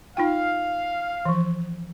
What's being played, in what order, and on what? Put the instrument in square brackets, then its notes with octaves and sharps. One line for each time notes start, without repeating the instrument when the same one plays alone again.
[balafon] D#4 F4 G5 [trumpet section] F5
[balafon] E3 F3